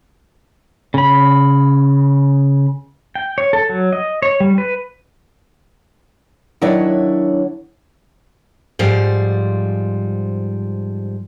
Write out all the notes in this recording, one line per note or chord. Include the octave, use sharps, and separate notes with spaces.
C#3 B5
G5
C#5
A4
F#3
D#5
C#5
G3
B4
D#3 F#3 D4 E4 C#5
G#2 F3 G3 C5